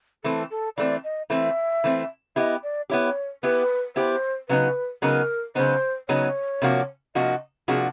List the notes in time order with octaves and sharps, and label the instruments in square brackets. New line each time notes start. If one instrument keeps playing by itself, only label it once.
[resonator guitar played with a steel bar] E3 A3 C4 [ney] A4
[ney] A4
[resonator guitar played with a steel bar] E3 A3 C4 [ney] D5
[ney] D#5
[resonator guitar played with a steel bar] E3 A3 C4 [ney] E5
[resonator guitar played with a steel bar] E3 A3 C4
[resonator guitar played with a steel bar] B3 E4 G4 [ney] D#5
[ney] D5
[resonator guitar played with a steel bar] B3 E4 G4 [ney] C#5
[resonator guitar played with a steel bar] B3 E4 G4 [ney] B4
[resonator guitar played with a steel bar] B3 E4 G4 [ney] C5
[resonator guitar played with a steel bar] C#3 F#3 B3 D#4 [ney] B4
[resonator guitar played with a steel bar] C#3 F#3 B3 D#4 [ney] A#4
[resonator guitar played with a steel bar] C#3 F#3 B3 D#4 [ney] C5
[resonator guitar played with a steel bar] C#3 F#3 B3 D#4 [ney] C#5
[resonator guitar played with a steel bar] C3 F3 A#3 D4 F#4
[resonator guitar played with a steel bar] C3 F3 A#3 D4 F#4 [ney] D#5
[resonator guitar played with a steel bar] C3 F3 A#3 D4 F#4 [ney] G#4